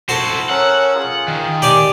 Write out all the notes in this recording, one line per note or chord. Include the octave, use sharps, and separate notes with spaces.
E4 F#4 A4 C5
C#4 A#4 F#5 E6
F4 G#4
D#3
G4 D5 G#5